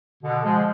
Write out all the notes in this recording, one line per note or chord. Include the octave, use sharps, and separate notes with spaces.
B2 D3
F3 G#3